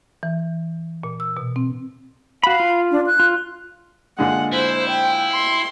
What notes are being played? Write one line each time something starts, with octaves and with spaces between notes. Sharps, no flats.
E3
A#2
E6
B2
C4
F#4 F5 B5
F4
D4
F#6
F4
A#2 D3 G#3 F#5
E4 C5
G5
C6